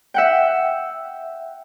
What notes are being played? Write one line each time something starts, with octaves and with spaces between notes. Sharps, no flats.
E5 F#5 G5